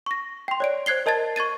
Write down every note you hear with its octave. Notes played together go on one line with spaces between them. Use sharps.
C#6 A#6
G5 C6
C#5 D5 D7
C5 F#6 G#6 C7 G7
A#4 D#5 A5 G#6 A6
C#6 G#6 A6 D#7